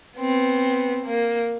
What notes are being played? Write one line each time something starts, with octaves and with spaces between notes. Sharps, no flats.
B3 C4
A#3